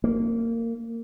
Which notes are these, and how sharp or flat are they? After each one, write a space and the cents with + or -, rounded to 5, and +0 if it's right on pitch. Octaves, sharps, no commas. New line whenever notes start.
A#3 -20